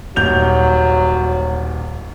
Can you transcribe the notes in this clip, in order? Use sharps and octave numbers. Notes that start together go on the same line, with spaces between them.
D#1 F#3 G6 F7